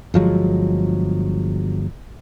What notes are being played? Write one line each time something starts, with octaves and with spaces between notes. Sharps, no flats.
G1 F3 F#3 G#3